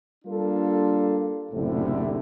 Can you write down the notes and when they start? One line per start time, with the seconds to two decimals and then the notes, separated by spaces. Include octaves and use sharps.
0.25 G3 A#3 D4 F4 A4
1.52 F#1 D2 A2 C3